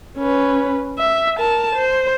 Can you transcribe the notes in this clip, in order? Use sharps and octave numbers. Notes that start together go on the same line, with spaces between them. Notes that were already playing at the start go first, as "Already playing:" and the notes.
C#4 B4
E5
A#4 A5
C5